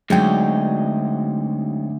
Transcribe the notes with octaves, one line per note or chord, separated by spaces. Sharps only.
D2 F#3 G#3 C4 D#4 G5